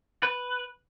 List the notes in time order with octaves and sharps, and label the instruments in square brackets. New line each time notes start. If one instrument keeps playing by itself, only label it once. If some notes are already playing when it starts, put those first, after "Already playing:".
[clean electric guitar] B4